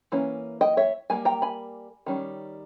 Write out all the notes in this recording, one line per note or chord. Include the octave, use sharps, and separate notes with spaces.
E3 A#3 C#4
D#5 G5
C#5 E5
G3 A#3 G#5
G5 A#5
G#5 B5
D#3 G3 C#4